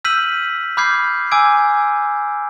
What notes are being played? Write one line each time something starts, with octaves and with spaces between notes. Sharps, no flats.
E6 F6 G6 B6 D#7 F#7
B5 D6 F6 G6 G#6 C7
G#5 D6 E6 G#6 D7